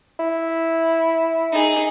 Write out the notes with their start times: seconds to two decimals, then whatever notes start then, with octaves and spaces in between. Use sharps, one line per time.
0.20 E4
1.53 D#4 G#4